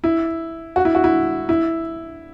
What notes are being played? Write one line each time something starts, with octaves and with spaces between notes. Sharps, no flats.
E4
F#4
E4
F#4
E4
E4